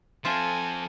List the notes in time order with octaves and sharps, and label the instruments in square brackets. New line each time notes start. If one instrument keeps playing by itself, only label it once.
[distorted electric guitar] F3 C4 [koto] F4 E5 [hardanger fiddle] A4 G#5